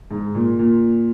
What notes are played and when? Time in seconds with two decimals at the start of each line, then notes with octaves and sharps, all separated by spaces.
0.11 G#2
0.35 A#2
0.59 A#2